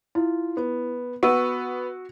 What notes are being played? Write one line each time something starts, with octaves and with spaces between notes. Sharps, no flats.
E4 F4
B3
B3 F#4 C#6 E6 D#7